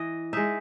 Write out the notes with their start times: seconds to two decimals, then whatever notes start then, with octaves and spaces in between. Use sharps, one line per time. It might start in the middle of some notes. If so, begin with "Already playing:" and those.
Already playing: E3 D#5
0.33 G#3 D#4 E5